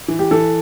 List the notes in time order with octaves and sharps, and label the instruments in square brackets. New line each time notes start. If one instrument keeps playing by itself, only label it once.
[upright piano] E3
[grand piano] G4
[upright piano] E3 [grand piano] A4